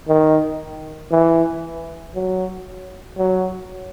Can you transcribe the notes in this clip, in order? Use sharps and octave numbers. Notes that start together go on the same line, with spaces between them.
D#3
E3
F#3
F#3